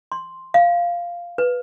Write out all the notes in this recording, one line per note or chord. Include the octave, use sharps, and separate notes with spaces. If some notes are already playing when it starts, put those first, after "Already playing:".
C6
F5
B4